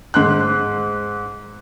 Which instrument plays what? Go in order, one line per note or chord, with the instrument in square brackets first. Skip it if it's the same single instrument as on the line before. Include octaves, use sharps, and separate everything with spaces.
[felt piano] G#2 C6 F#6